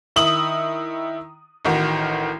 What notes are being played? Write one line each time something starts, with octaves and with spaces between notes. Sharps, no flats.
D#3 E4 D#6 F#7
A1 D#3 F#4